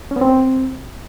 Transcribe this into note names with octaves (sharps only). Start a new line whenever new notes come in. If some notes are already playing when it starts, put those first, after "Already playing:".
C#4
B3
C4